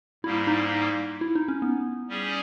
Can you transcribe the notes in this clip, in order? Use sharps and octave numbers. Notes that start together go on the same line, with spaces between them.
G#2 G3 A#3 E4
D#4
E4
D#4
C#4
B3
G3 C#4 G#4